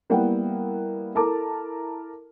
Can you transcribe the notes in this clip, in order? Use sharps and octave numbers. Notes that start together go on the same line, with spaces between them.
G3 A#3 B3 E4 F#5 G5
E4 A4 A#4 A5 A#5 D6